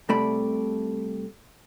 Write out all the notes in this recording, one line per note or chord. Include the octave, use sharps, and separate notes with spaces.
C2 C3 A3 D5 B5